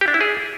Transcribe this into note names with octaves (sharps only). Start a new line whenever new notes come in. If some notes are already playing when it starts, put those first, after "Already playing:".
G4
D4
E4
G#4